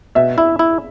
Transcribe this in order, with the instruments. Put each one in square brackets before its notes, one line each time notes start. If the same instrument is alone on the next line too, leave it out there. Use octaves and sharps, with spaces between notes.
[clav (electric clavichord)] B2 [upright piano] E5
[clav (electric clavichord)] E4 [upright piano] E5
[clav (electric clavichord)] E4